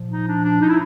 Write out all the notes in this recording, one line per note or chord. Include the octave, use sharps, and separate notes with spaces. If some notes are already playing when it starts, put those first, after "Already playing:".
Already playing: A#2 F3
D#4
D4
D4
D#4
E4